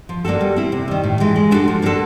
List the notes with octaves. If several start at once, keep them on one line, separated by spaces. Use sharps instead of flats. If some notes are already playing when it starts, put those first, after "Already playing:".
F3
A#3 D4 F#4 A4
G3
C4 E4
C3
D#3 G3
A2
E3 G#3
G#3
B3 D4 F#4 A4
F3
A#3 D4 F#4 A4